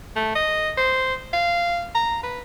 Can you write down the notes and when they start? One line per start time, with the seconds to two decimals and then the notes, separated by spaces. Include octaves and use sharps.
0.16 A3
0.35 D#5
0.77 C5
1.33 F5
1.95 A#5
2.23 B4